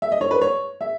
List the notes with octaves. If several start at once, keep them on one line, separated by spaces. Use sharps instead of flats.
E5
D#5
C#5
B4
C#5
E5